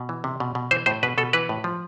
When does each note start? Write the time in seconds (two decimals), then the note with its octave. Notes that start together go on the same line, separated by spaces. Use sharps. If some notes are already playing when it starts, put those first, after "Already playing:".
Already playing: B2
0.09 E3
0.24 C3
0.40 B2
0.55 B2
0.71 E3 C5
0.86 A2 C5
1.03 B2 B4
1.18 B2 A4
1.33 E3 B4
1.49 A2
1.64 F3